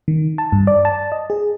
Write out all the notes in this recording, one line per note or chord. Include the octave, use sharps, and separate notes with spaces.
D#3
A5
G2
D5
A5
D#5
G#4